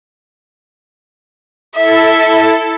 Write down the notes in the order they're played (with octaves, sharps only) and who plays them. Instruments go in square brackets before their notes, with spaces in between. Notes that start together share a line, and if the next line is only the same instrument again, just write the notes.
[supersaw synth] E4 A4 [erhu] E5